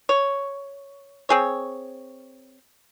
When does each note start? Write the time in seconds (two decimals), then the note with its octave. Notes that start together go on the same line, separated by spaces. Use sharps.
0.09 C#5
1.29 C4 G#4 C#5